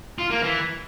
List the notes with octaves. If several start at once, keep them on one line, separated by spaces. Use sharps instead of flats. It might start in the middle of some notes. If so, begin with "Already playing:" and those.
F4
A#3
E3